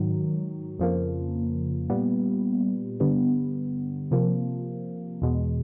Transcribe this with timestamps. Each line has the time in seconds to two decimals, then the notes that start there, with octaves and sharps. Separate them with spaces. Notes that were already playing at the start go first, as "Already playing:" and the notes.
Already playing: G#2 D#3 F#3
0.79 F2 C#3 F3 A#3
1.90 A#2 G3 B3
3.00 G2 D3 G3 B3
4.11 C3 F3 A#3
5.22 E2 B2 G#3